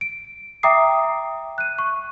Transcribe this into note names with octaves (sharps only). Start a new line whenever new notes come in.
D7
E5 G5 A#5 D6 D#6 C7
F#6 D#7
C#6